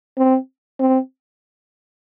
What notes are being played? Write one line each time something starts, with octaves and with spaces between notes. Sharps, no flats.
C4
C4